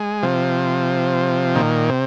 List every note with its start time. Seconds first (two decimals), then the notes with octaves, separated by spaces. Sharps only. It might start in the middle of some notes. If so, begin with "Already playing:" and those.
Already playing: G#3
0.23 C3 F3
1.55 A#2 D#3
1.89 C3